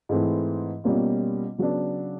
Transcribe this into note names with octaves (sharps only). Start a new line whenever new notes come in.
G#2 E3 A3 C4 E4
B2 G3 A#3 C#4 F4
C#3 F#3 B3 D4